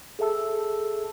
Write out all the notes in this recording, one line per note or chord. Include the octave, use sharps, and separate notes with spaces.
G#4 A4 E5 A5 E6